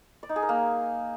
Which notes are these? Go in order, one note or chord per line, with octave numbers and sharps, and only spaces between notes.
D5
D#4
G#4
A#4
A#3